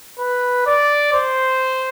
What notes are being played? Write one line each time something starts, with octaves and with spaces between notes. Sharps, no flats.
B4
D5
C5